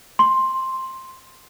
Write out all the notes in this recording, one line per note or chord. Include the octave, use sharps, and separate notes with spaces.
C6